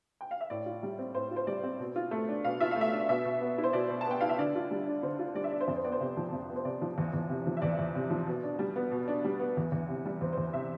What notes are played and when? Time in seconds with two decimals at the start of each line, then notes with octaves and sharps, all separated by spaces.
0.21 G5
0.31 F5
0.41 E5
0.50 A2 D5
0.66 F4
0.83 G3
0.99 C4
1.14 A2 C5
1.31 F4
1.36 C5
1.47 G3 D5
1.64 C4
1.80 B2
1.96 F4
2.11 A3
2.29 D4
2.45 B2 F5
2.61 F4 E5
2.71 A3 F5
2.81 E5
2.93 D4
3.09 B2 E5
3.25 B2
3.41 B3
3.58 E4
3.64 C5
3.73 B2 D5
3.90 B2
4.01 A5
4.07 B3 G5
4.21 E4 F5
4.29 E5
4.39 D3 D5
4.55 F4
4.71 G3
4.88 D4
5.03 D3 C5
5.19 F4
5.35 G3 D5
5.44 E5
5.51 D4 D5
5.61 C5
5.68 F2 D5
5.76 C5
5.84 B3 D5
5.92 C5
6.00 C3
6.17 F3
6.33 F2
6.50 B3
6.56 C5
6.65 C3 D5
6.82 F3
6.98 E2
7.13 E2
7.29 C3
7.47 F3
7.57 E5
7.62 E2 D5
7.79 E2
7.95 C3
8.11 F3
8.27 B2
8.44 D4
8.59 G3
8.76 B3
8.91 B2
9.08 D4
9.25 G3
9.40 B3
9.57 E2
9.72 E2
9.89 C3
10.05 G3
10.21 E2 C5
10.33 E2 C5
10.54 C3 E5